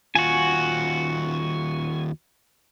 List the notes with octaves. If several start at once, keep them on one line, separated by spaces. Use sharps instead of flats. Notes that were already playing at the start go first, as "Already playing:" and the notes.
D#2 F4 F#4 G#5